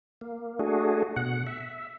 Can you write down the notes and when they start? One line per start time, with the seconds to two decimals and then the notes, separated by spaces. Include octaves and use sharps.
0.21 A#3
0.59 A3 D4 F#4 G#4
1.16 B2 F#5
1.47 E5